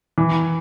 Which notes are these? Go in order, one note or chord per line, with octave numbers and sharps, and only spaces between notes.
E3